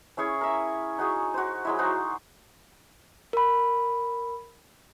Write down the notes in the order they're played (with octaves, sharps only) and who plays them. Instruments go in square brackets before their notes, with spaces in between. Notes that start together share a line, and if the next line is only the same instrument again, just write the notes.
[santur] C#4 E4 G#4 C#5
A#4 E5
D#4 F#4 G#4
F#4 C5
F#3 G#3 E4
D#4 F#4 G#4 C5
[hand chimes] A#4 B5